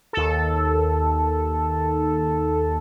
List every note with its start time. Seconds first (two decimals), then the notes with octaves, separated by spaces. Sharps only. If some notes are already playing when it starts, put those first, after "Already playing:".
0.13 D#2 A4